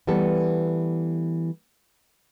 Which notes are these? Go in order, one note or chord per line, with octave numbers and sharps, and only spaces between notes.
E3 G3 B3 A4